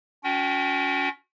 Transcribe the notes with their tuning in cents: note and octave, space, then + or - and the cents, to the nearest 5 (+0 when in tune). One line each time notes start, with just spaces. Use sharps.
C#4 +30 F#4 -25 G5 -25